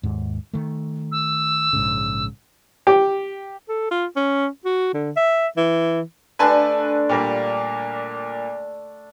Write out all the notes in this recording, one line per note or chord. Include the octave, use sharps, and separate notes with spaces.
D#2 G#2
D#3 A3
E6
A#1 G#2 C#3
G4
A4
F4
C#4
F#4
D3
E5
E3
D3 A3 D4 B4 G#5 A5
A#2 G3 A#3